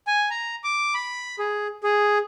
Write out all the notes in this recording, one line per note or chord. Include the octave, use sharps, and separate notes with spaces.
G#5
A#5
D6
B5
G#4
G#4